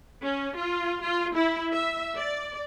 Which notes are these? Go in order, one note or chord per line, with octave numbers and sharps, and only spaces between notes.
C#4
F4
F4
E4
E5
D5